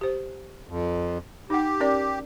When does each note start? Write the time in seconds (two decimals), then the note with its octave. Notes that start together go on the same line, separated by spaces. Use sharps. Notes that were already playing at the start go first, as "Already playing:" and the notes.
0.01 G4 C5
0.67 F2
1.50 D#4 G4 F#5
1.80 C#4 A#4 D5